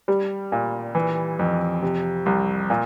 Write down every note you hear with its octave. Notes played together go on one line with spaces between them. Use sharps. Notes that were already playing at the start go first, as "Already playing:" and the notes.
G3
A#2
E3
F2
C3
C2
A#2